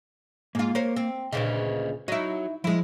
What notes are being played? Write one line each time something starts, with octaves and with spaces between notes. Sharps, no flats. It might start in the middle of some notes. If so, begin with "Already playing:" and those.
G#2 A#3 F4
A#4 C5 C#5
C4
D2 A#2 C#3 B4 C5 D#5
D#4 E4 F#4 C#5
F3 G#3 E4